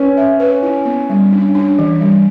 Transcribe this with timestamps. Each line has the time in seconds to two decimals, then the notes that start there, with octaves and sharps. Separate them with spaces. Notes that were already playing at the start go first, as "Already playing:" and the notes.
Already playing: C#4 B4
0.17 E5
0.40 B4
0.63 E4
0.85 B3
1.10 G3
1.33 D4
1.55 D4
1.79 E3
2.01 G3